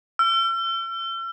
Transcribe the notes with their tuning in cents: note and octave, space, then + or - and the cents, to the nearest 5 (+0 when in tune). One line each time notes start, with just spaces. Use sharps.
E6 +45